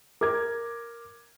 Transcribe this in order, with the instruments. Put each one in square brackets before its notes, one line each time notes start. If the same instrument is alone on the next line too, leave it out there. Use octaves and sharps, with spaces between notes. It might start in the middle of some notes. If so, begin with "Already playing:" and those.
[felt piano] A#4 [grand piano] D6 G#6